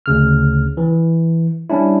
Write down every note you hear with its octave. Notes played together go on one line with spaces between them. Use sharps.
D2 C#3 F6
E3
G3 C#4 D4 E4